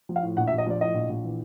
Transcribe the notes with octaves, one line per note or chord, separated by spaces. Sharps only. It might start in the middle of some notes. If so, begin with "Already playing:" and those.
F3
F5
A2
A#1 F#5
E5
A#1
D#5
F3 D5
A2 D#5
A#1
A#1
E3